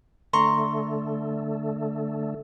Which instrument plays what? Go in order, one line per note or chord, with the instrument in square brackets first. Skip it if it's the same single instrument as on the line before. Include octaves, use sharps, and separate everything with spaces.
[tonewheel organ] D3 A3 [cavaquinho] A#5 C6 C#6